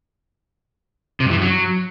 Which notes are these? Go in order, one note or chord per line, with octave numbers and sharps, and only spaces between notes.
C3
G2
E3
G2
F#3